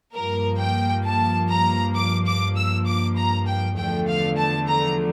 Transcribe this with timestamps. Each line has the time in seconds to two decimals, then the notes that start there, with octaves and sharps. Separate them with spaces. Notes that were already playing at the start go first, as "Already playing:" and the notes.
0.14 G2 F3 A#3 A#4
0.59 G5
1.05 A5
1.49 A#5
1.95 D6
2.26 D6
2.56 E6
2.86 D6
3.16 A#5
3.47 G5
3.77 E2 D3 F3 A3 G5
4.07 F5
4.37 A5
4.67 A#5